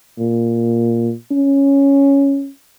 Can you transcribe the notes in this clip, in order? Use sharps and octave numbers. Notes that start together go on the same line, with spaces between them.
A#2
C#4